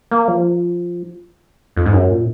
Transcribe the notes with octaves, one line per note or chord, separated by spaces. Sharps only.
A#3
F3
F2
G#2
F#2
A#2